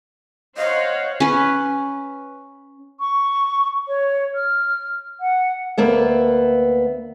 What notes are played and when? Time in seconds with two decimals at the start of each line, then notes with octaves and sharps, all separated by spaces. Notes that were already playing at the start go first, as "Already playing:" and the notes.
0.57 C5 C#5 D#5 F5 F#5
1.20 C#4 B4
3.00 C#6
3.88 C#5
4.35 F6
5.20 F#5
5.78 D2 A#3 B3 E5